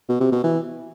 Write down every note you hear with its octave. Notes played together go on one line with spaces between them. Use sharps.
B2
C3
B2
E3